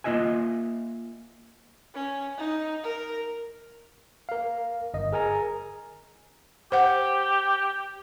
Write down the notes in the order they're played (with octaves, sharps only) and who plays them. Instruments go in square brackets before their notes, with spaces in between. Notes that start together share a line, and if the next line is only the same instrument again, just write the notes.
[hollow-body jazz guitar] A#3 F4 D#5 E5 G#5
[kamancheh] C#4
D#4
A#4
[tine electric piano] A#4 F5
G1 D#5
G#4 A#4 G#5 A#5
[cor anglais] G4 [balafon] C5 F#5